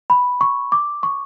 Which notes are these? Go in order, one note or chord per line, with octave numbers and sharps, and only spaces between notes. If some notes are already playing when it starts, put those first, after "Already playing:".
B5
C#6
D6
C#6